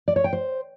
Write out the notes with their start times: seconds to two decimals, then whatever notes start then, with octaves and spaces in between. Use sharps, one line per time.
0.08 D5
0.16 C#5
0.24 G5
0.33 C5